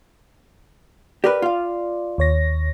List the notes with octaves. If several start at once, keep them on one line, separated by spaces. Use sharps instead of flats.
G4 A#4 B4 D5
F4 F5
D#2 C#5 A#6